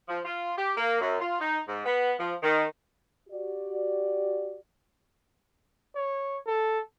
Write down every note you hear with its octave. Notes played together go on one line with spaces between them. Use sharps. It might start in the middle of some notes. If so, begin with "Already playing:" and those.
F3
F4
G4
A#3
F#2
F4
D#4
G#2
B3
F3
D#3
F#4 G4 D5
C#5
A4